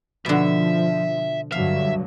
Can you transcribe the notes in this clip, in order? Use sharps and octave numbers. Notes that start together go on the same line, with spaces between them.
B2 D3 F3 E5
G2 D3 F#3 E5 F5